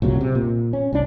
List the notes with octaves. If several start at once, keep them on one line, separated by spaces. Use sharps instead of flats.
C2 A#2 C#3 F#3
C3
A#2
C#4
C2 D4